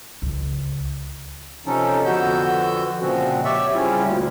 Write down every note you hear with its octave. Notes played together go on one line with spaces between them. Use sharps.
C#2
C3 F3 C#4 D#4 A4
F2 D3 B3 F#4 E6 G6
A#2 C#3 F3 G#3 C4 F#4
G4 C#5 D5 E5 C#6 E6
C#3 G3 C4 C#4 E4 F4
D2 A#2